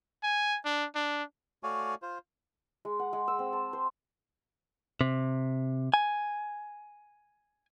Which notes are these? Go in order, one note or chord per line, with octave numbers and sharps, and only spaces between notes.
G#5
D4
D4
A3 F#4 C#5 D5 F5 G#5
F4 C5
G#3
F#5
G#3
E6
C4
A5
C5
C3
G#5